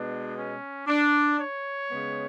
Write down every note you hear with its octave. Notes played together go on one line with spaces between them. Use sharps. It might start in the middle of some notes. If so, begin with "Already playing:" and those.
Already playing: B2 G#3 B3 D4
C#4
D4
C#5
C#3 G#3 B3